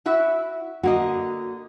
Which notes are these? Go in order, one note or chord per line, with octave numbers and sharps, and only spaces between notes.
E4 F#4 E5
D3 A#3 F#4 D#5